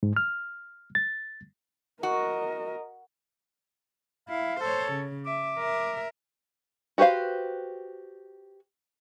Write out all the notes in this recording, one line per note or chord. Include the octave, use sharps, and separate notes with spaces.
G#2
F6
A6
F#4 A#4 D#5
E4 F5
A4 C5 C#5
C#3
E5 D6
A#4 E5
F#4 G4 B4 C5 F5